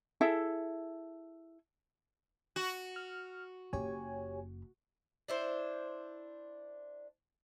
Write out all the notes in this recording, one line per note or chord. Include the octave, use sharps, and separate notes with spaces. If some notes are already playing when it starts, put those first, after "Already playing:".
E4 G#4 A4 E5
F#4
F6
F#1 G4 C#5 G#5
D4 E4 C5